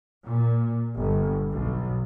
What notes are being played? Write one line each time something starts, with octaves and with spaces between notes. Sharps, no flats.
A#2
G1
B1